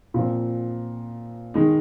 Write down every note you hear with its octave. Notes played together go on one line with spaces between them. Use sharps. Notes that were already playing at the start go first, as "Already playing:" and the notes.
A#2 F3 C4
D#3 G#3 D#4